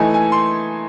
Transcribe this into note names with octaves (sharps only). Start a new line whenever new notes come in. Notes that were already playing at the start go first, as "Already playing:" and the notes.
Already playing: E3 A3 D#4 G#5
G#5
C6